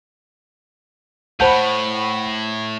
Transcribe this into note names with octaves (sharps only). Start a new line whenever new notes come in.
A2 C5 F#5 A5 B5 G6